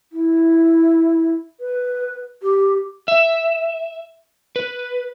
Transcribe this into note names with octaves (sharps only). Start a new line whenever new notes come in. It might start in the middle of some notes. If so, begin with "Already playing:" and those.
E4
B4
G4
E5
B4